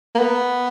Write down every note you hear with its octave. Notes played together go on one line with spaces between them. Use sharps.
A#3
B3